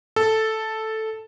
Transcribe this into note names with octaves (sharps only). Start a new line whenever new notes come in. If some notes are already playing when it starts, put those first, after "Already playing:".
A4